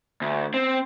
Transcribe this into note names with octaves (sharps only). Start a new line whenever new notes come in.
D2
C4